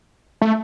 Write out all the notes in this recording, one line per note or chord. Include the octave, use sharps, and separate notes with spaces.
A3